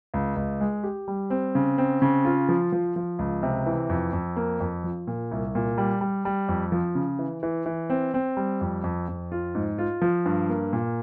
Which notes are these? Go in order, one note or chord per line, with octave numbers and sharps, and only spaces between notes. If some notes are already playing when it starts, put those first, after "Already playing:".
C#2
C#2
G#3
G4
G3
C4
C#3
C4
C#3
F4
F3
F3
F3
C#2
C3
E3
F2
F2
A#3
F2
F3
A#2
C2
A#2
G3
G3
G3
F2
F3
C#3
E3
E3
E3
C4
C4
G3
F2
F2
F2
F4
G#2
F4
F3
G2
A#3
A#2